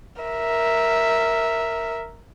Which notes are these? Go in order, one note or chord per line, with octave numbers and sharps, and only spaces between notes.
A#4 E5